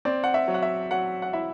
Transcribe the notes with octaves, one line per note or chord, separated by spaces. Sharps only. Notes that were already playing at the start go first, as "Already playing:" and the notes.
C4 D5
F#5
E5
F#3
F#5
E5
F#3 F#5
F#5
E4 E5